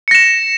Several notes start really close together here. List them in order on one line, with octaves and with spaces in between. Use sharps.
C#7 A#6 E7